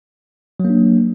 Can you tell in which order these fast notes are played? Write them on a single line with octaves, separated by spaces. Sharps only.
F#3 A#3 D4